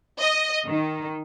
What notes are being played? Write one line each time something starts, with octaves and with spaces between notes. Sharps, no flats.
D#5
D#3